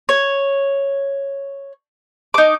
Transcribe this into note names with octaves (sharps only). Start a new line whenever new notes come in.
C#5
D#4 D6